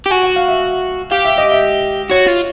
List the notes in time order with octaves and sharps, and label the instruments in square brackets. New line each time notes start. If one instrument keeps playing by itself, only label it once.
[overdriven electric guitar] G4
[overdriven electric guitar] F#4 [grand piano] G#5
[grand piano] F#5
F5
E5
[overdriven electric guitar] G4 [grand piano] F5
[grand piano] E5
D#5
E5
[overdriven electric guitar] F#4 [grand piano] C#5
[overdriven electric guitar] F4